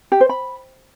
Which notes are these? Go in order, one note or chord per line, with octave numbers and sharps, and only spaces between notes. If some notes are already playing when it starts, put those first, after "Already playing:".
G4
C5
B5